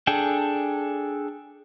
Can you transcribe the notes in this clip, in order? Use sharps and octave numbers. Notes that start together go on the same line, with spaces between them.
D4 G#4 A4 G5